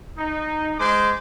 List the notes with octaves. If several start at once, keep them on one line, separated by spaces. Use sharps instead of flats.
D#4
G#3 C5 D6